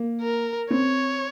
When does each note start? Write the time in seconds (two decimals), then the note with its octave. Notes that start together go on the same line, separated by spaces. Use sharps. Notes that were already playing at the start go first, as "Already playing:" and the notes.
Already playing: A#3
0.21 A#4
0.71 C4 C#5